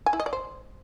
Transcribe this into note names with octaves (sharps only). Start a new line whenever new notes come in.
G#5
E4
D#5
D5
C5